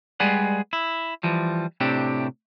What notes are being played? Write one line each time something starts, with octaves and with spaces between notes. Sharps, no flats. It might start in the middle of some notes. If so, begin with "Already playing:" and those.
G3 G#3 G#4 B4 D5 F#5
E4
E3 F3 G3
A2 C3 C4 D4 G4